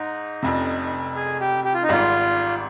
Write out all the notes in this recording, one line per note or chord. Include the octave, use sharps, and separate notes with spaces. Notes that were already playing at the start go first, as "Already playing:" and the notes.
Already playing: G#2 D#4
F1 F2 C3
G#4
G4
G4
F4
D#4
G#1 G#2 G3 F4